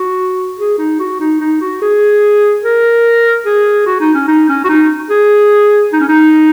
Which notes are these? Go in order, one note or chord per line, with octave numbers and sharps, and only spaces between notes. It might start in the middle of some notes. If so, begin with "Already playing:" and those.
Already playing: F#4
G#4
D#4
F#4
D#4
D#4
F#4
G#4
A#4
G#4
F#4
D#4
C#4
D#4
C#4
F#4
D#4
G#4
D#4
C#4
D#4